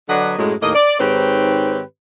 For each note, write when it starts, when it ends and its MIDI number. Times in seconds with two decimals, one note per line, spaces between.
0.09 0.35 50
0.09 0.35 54
0.09 0.35 62
0.09 0.35 71
0.09 0.35 75
0.09 0.35 78
0.38 0.54 42
0.38 0.54 45
0.38 0.54 54
0.38 0.54 56
0.62 0.70 39
0.62 0.70 45
0.62 0.70 58
0.62 0.70 75
0.75 0.98 74
1.00 1.81 44
1.00 1.81 51
1.00 1.81 60
1.00 1.81 67
1.00 1.81 71
1.00 1.81 73